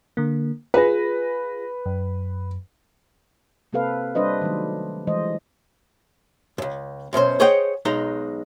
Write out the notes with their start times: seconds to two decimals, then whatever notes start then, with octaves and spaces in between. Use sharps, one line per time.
0.17 D3 A#3
0.74 F4 G#4 B4 A#6
1.86 F#2
3.73 C3 A#3 C4 A4 B4 F5
4.15 G3 D4 B4 C5 D#5 E5
4.41 D#3 F#3 A3
5.07 E3 F3 G#3 C5 D#5
6.58 C#2 F#2
7.13 F#2 B2 C#4 C5
7.40 G#4 C5 C#5 D#5 F#5 G5
7.85 B1 G#3 D#4 A#5